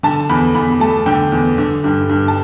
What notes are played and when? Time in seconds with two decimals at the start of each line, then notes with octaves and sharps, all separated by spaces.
0.03 D3 A5
0.29 E2 B5
0.55 E2 B5
0.80 A3 A5
1.06 D3 G5
1.32 E2
1.58 D3
1.84 G2
2.09 G2
2.28 A5